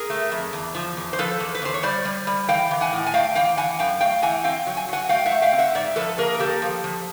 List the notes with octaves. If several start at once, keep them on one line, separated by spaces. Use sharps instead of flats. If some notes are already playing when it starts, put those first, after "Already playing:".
Already playing: G#4 A#4
A3
F2
E2
F3
E2
C5
F3 A4 B4
E2
B4
E2 C5
C#5
G3 C5 D5
G3
G3
E3 F5 G5
E3
F#5 G#5
A2
G#5
A3 F5 G5
E3 F5 G5
E3 F#5 G#5
F#2 F5 G5
A3 F5 G5
E3 F#5 G#5
C4 F5 G5
F#3
G#5
F#3 F#5 G#5
A3 F5 G5
E5 F#5
A3
F5 G5
C4
E5 F#5
G#2 D5 E5
F3 A4 B4
A#3 G#4 A#4
A#4
A#3 G4 A4
F3
F3